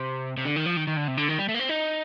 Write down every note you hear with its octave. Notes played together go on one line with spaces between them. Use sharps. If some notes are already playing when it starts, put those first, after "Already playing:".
Already playing: C3
C3
D3
D#3
F3
D#3
D#3
D3
C3
D3
D#3
G3
A3
A#3
C4
D#4